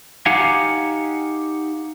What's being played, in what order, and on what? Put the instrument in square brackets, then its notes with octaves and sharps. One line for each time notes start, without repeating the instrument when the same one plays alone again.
[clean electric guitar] D#4 G4 F5 F#5 G#5